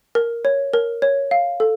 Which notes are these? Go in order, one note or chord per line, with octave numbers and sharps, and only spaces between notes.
A#4
C#5
A#4
C#5
F5
A4